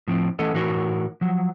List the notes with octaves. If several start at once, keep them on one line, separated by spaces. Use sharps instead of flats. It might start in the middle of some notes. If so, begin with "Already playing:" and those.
A2 F3 C4
E3 A3 B3 C#4 A4 D#5
A2 E3 D#4 F#4 A#4 C#5
F3 F#3